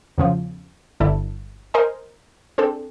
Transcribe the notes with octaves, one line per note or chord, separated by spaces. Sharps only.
E2 C#3 F3
G1 D3 E4 A5
A#4 C5 D#5 G#5
C4 D4 G#4 A4